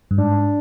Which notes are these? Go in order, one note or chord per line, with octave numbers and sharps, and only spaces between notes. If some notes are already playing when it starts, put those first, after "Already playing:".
G2
G#2 D4